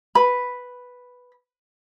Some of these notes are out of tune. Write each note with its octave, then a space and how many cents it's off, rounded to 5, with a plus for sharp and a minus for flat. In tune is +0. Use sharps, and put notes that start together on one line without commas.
B4 +0 B5 +0